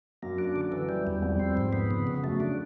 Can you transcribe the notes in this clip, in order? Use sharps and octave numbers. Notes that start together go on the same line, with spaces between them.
F#2 A#3
D4
D3
E3
G3
E2
F2 G3
C4
G#2
B3
C#3
C#3
F#2 A3
D4